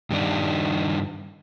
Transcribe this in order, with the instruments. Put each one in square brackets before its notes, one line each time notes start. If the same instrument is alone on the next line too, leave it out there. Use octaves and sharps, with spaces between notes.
[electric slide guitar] G2 D#3 D4